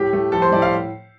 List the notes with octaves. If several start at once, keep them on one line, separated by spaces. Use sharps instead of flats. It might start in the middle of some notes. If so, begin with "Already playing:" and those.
Already playing: A2 G4
A3
F3 A4
C5
A2 D5
F5